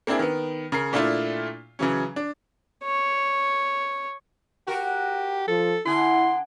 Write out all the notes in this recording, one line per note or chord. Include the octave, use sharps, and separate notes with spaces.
A#3 C4 D4 E4 G#4
D#3 B3
C#3 A#4 C7
A#2 A3 D4 E4 F4
C#3 E3 F#3 C#4
D4
C#5
F#4 G4 A#4
F3 A4
D3 E4 G#4 C6